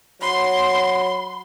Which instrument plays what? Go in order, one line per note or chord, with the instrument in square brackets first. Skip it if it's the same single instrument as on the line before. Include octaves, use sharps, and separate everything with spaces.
[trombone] F#3 [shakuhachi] B5 [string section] C6